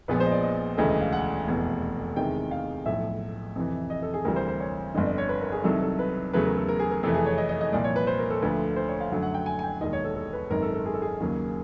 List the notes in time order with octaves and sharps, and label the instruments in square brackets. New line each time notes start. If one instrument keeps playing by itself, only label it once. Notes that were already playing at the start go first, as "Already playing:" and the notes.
[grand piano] A#1 A#2 F3 G#3 B3 B4
C5
D#5
D5
D#5
E1 D2 C#3 E3 A3 D#5
D#5
F5
F#5
F1 E2 B2
E2 C3 D#3 G#3 G5
F5
B1 A2 F3 E5
F2 C3 E3
D#5
A4
G#4
D2 C3 E3 G3 A#4
C5
C5
C#5
G1 F2 D3 D#5
D5
C#5
B4
A#4
G#4
C2 C3 D#3 F#3 A4
A4
B4
E2 C#3 F#3 A3 B4
A#4
A4
A#4
G#4
A#4
F2 C3 E3 A3 A4
G#4
C#5
D#5
D#5
D#5
C2 A#2 F3 D5
C#5
B4
C5
A#4
A4
D2 D3 F3 A3 B4
C5
C#5
F5
F#2 D3 F#3 A3 F#5
F#5
G5
G#5
G#5
G5
E1 D#2 D#3 D#5
C#5
A4
A4
B4
G#1 F#2 D#3 A#4
A4
A4
G#4
A4
G#4
D#2 C#3 F#3 A#3